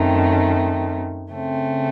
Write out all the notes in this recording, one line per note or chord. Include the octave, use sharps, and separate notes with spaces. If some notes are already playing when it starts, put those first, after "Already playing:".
Already playing: F#2 D#3 A3 C4
C#3 A3 C4